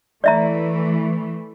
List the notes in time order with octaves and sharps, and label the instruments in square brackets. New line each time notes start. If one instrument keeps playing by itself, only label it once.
[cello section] E3 A3 [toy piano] D5 E5 A#5